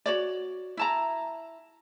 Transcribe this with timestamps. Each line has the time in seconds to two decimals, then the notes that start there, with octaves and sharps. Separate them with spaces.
0.06 F#4 C#5 D5
0.77 E4 A5 A#5